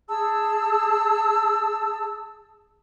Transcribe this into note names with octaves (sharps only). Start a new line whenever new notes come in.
G#4 A5 E6